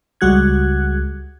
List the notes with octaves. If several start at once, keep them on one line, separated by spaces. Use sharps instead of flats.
C#2 G3 G#3 F#4 F#6 G#6